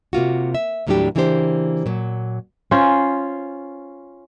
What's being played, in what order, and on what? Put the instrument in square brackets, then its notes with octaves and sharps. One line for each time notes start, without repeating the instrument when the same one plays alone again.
[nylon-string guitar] C3 A#3 F4 F#4
E5
D#2 A2 F#3 G3 D4 G4
C#3 E3 A#3 D4 G4 C5
A#2 F#3
[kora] C#4 F4 C5